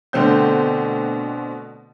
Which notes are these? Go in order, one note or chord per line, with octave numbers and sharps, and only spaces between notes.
B2 D3 A3 C4 G6